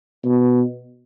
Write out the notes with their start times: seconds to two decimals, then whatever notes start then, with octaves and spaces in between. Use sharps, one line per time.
0.24 B2